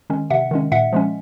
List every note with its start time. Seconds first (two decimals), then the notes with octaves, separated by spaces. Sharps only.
0.10 D#3 G#3 C#4
0.30 C3 E5 F#5
0.51 D#3 G#3 C#4
0.72 A#2 E5 F#5
0.93 F3 G#3 C#4